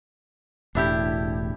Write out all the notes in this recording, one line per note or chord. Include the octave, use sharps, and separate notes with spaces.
E1 A2 D4 E4 G4